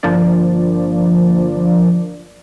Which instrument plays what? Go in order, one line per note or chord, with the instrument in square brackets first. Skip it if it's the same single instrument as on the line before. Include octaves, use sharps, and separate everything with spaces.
[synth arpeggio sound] G1 F3 A#3 D4 D5